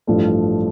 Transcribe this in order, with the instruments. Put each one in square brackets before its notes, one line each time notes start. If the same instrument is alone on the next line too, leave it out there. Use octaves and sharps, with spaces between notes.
[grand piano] A1 G2 F3 A3 D4